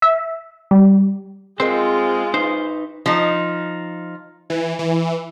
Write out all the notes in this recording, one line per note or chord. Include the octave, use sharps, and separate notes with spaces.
E5
G3
G#3 C4 F4 G#4 A#4 C5 D#5
D#4 B4 C5
F3 D#4
E3
E3